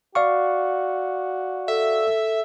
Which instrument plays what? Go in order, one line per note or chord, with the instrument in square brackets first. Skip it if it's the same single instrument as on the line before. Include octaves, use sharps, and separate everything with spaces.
[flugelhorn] F#4 [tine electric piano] D5 F5 C#6
[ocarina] A4 [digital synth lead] E5